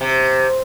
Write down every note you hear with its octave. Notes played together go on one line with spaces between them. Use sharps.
C3